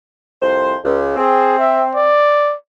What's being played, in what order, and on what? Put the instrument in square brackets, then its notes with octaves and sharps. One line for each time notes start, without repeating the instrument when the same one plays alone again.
[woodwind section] C2 F2 C5
C#2
[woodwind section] C4 [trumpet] G#4
[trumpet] E5
D5